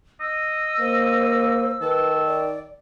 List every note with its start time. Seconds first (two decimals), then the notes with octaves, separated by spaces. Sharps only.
0.21 D#5 E6
0.80 A#3 C5
1.82 D#3 A4 B4
2.27 D5